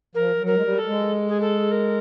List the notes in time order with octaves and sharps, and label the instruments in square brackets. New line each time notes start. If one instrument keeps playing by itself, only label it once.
[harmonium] F3 [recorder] A#4
[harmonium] F#3
[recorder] A#4
[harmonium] G#3
G3
[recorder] A4
[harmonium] G#3
[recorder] G#4
A4
A#4